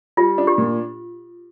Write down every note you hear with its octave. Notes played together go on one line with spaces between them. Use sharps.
G3 F4
D4
G4
A#2